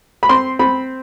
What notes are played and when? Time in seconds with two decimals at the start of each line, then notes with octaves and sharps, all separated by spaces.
0.23 B5
0.29 C4 C6
0.59 C4 B5